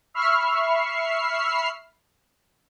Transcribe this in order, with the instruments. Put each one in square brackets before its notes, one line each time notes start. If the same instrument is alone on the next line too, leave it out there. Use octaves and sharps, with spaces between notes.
[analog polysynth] E5 B5 C#6 E6 F6 C7